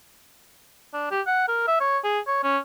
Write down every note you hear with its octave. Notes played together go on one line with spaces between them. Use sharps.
D4
G4
F#5
A#4
E5
C#5
G#4
C#5
C#4